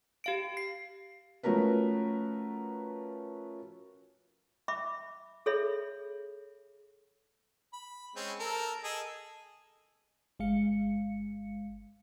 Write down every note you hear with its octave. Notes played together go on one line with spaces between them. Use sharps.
G4 F5 D7
C7
F3 A3 C#4 F#4 A#4 B4
E5 B5 D6
G#4 A4 C#5 E5 B5
B5
G#3 C4 C#4
A4 A#4
G#4 A4 D#5
G1 G#3 F5 C#7